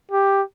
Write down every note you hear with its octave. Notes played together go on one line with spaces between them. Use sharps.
G4